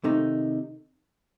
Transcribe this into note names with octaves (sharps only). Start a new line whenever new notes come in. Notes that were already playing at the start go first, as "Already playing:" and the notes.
C3 D#3 A3 D#4